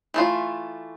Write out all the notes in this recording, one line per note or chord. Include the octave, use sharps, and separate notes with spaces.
E3 A3 F4